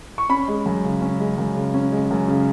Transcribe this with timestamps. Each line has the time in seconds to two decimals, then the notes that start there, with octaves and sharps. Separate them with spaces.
0.18 C#6
0.29 C#4 B5
0.48 G#3
0.66 F#2
0.84 C#3
1.02 C#4
1.20 G#3
1.38 F#2
1.56 C#3
1.74 C#4
1.92 G#3
2.11 F#2
2.28 C#3